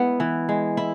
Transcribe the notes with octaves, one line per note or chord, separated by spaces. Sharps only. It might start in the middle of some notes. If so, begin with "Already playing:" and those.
Already playing: G#3 B3 E4
E3
G#3
E4